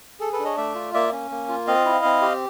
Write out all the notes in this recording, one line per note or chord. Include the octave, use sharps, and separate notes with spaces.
G#4 A4
A4 B4
D4
C#5 D#5
A3 D5 E5
F4
A#3 D5 E5
C#4
A#3
F4
C4 D#5 F5
E4
C4
G4